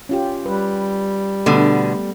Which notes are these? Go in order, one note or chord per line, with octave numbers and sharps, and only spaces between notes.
C#4 F4 G4
G3 B4
B2 D3 A3 B3